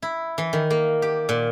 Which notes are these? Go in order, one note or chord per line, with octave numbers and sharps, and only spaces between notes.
E4
E3
D#3
A#3
G4
A#2